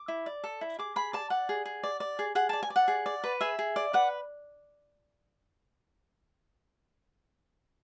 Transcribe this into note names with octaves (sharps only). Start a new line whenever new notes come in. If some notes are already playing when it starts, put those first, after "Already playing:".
Already playing: D6
E4
D5
A4
E4
G#4 D6
G#4 B5
D5 A5
D5 F#5
G#4
G#4
D5
D5
G#4
G#4 F#5
D5 A5
G#5
D5
F#5
G#4
D5
B4
G#4 E5
G#4
D5
B4 F#5